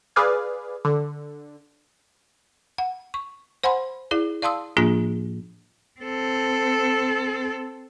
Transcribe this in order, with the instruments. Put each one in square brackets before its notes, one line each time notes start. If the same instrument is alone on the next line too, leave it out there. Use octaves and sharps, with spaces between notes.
[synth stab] G#4 B4 D5 F5 G#5
D3
[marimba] F#5
C#6
C5 F#5 G#5 B5 C6
E4 G#4 D5
D5 F5 A5 C6 D#6 E6
A2 F3 A#3 D4 F4 G#4
[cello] C4 A4